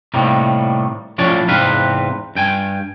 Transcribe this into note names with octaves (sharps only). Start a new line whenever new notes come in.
A2 C3 D#3 G3 A#3
A2 F3 C#4 D4 C#5 D5
E2 G#2 C3 C4 B4 F5
G2 G5 G#5